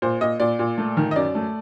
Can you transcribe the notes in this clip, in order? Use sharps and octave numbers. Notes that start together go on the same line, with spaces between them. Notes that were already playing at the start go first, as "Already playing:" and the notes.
A#2 C5
A#2 D#5
A#2 D5
A#2
A3
D#3
D#5
F#2 D5
A3